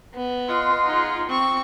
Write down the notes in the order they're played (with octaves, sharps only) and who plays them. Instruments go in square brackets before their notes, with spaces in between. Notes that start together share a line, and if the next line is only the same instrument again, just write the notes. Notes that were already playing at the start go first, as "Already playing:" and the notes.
[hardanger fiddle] B3
[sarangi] F4 [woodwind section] D#5 F#5 C6
[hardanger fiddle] D#4 G#4
[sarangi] C4 [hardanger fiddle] C#6